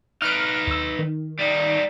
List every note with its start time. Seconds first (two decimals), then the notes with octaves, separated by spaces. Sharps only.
0.22 D#4 B4 F6 F#6 D7
0.67 D#2 E6
0.99 D#3
1.39 G3 D#4